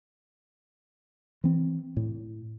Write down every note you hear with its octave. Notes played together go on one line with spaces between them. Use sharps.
E3 C4
A2